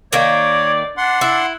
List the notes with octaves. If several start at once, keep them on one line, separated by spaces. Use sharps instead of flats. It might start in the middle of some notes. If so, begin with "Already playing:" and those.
D#3 A#3 C#5 D5
D4 F#5 C6
E4